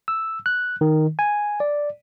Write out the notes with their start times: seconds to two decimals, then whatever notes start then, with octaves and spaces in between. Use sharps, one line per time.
0.08 E6
0.46 F#6
0.81 D#3
1.19 G#5
1.60 D5